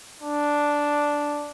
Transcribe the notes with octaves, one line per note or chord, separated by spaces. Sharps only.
D4